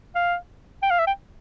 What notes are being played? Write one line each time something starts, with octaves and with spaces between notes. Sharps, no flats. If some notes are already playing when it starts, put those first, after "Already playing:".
F5
G5
F5
E5
G5